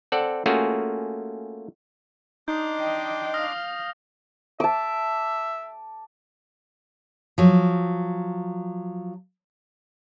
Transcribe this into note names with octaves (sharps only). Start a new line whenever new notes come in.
C4 A4 D5 F#5
A3 A#3 C#4 F4 F#4 G#4
D4 D#4 C6 D6 D#6 G6
D#5 G5
F5 D#6 F6 A#6
E5 A5 D6
F3 F#3